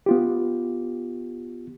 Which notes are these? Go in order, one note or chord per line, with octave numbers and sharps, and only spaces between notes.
B3 F4 G4